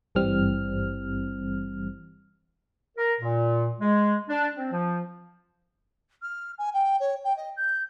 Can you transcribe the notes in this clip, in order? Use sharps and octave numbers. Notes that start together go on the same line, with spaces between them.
G#1 G2 E3 G3 C4 F6
A#4
A#2
G#3
D4
C4
F3
F6
G#5
G5
C#5
G5
D#5
G6